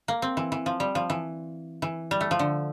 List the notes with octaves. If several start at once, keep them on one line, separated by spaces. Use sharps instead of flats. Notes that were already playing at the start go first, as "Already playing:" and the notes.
A#3
C4
E3
E3
F3
G3
F3
E3
E3
G3
A3
F3
D3